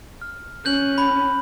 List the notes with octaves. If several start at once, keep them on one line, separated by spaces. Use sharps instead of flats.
F6
C#4 F#6 G6 F#7
B5